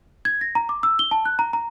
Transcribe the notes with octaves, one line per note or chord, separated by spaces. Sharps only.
G#6
A#6
A#5
D6
E6
G7
A5
F#6
A#5
A#5